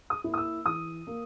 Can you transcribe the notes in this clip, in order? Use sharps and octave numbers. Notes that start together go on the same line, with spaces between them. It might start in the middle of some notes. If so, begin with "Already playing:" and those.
D#6
A#3 E4
D#6
E6
E3 D#6
A#3